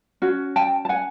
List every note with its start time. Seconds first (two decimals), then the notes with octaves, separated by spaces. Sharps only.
0.22 C#4 F#4
0.56 G5 A5
0.85 A5
0.89 F#5 G#5